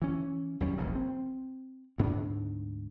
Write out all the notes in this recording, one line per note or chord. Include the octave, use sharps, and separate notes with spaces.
E3 C#4
D#2 F#3 G3 C#4
E1 A#1 C#3
C4
D2 G#2 B3 D4